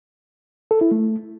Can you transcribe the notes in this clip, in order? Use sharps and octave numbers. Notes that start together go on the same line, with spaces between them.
A4
E4
A3